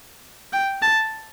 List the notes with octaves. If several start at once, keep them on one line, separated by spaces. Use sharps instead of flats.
G5
A5